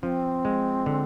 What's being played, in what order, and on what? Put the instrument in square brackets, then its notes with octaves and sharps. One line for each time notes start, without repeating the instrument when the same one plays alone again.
[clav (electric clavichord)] F3 [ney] C4 C#4
[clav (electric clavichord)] G#3
D3